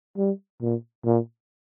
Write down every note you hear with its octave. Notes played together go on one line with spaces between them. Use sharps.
G3
A#2
A#2